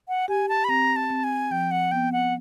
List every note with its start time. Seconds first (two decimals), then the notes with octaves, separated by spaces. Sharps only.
0.08 F#5
0.28 G4 G#5
0.49 A5
0.64 B5
0.69 C4 A#5
0.96 A5
1.10 C4
1.24 G#5
1.51 F3 G5
1.71 F#5
1.91 B3 G5
2.12 F#5